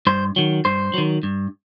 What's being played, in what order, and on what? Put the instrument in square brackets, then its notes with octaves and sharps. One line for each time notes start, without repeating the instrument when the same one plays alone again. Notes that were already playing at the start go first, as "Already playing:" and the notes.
[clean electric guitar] G2 C5
D#3 F#3
G2 C5
D#3 F#3
G2